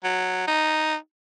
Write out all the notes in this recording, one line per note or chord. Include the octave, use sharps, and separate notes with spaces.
F#3
D#4